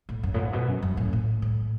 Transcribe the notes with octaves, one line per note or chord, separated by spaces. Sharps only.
A2
F#2
A2
G#2
B2
F#2
F#2
A2
A2
A2